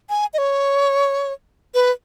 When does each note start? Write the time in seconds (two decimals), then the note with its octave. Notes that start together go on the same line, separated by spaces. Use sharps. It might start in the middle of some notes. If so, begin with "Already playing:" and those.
0.10 G#5
0.34 D#5
0.38 C#5
1.74 B4